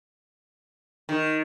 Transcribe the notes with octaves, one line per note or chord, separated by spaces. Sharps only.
D#3